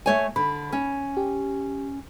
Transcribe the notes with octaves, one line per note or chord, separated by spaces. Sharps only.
A3 C#5 G#5
D3 B5
C#4
G4